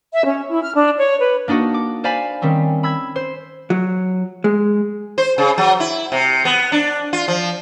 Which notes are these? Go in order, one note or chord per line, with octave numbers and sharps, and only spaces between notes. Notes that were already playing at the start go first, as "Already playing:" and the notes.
E5
C#4
E4
F6
D4
C#5
B4
A#3 D4 D#4 F#4
D6
C5 D5 F5 G#5 B5
D#3 G3 C4 C#4
B5 E6 G#6
C5
F#3
G#3
C5
C#3
F#3
E4
C3
B3
D4
F4
F3